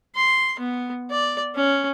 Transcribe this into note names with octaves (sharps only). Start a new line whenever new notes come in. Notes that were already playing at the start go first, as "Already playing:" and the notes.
C6
B3
D5
C#4